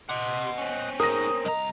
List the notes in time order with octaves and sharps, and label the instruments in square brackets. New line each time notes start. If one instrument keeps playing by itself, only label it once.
[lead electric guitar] C3 [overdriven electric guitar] D#5 F#5
[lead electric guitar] C4 C#4
[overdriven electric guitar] D#4 G#4 [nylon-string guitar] A#4 [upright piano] D#6 A#6
[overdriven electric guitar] C2 A#5 [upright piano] D#5